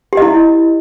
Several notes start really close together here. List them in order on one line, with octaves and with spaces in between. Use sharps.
G4 D#5 E4